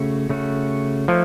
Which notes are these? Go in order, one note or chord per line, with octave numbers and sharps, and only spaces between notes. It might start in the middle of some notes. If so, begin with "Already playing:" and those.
Already playing: C#3 A3 C#4 F#4
C#3 A3 C#4 F#4
F3 A3 D#4 A4 C#5